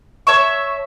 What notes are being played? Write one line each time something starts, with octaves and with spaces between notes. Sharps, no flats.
C#5 E5 A5 C#6